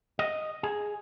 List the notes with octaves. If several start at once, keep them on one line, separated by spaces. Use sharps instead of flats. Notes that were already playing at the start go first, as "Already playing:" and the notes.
D#5
G#4